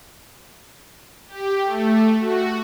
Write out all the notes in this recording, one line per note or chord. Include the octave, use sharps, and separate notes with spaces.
G4
A3
F#4